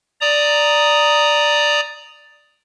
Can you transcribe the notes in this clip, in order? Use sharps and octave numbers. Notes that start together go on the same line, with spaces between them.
D5 A#5 D#6